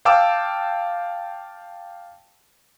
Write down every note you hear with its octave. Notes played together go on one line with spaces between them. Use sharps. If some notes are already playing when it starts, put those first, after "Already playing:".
F5 G5 A5 D6 E6